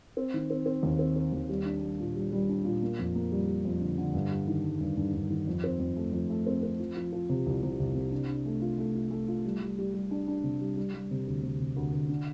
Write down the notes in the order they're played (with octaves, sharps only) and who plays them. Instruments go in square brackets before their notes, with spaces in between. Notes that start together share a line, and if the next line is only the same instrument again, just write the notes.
[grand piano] C4
D#3
C4
C4
D#2
C4
C4
D#2
G3
D4
G3
A#2
G3
G3
D4
A#2
A#3
F2
A#3
G3
G3
F2
D3
D3
G2
G3
D#3
G3
G2
G2
G2
D#3
F2
C4
F2
A3
F2
A3
C4
C4
F3
F3
F3
C3
C2
C3
C2
C3
D4
D4
A3
F4
A3
F4
A3
F4
G3
G3
G3
G3
D4
D4
C3
G3
G3
G3
C3
D2
C3
C3
D2
D2
D3